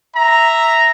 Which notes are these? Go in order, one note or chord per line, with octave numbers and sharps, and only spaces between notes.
E5 A#5